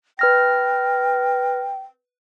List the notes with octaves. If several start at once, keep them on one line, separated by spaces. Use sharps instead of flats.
B4 G5 F6 A#6